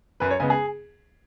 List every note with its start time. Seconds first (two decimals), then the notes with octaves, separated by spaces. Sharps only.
0.20 F#2 B4
0.31 C#5
0.40 C#3 G#3 B3 G#5
0.50 G#4